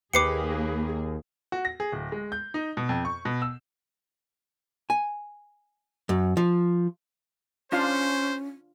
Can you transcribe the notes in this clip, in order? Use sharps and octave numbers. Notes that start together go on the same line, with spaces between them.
D#2 A#3 G4 G#4 B4 D6 C7 C#7
F#4
A#6
G#4
D1
G#3
G6
D#4
B2
F2
C#6
B2
E6
G#5
F#2
F3
C#4 D4 F4 C5 F5